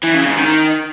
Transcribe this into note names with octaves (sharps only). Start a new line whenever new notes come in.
E3
C#3
G#2
D#3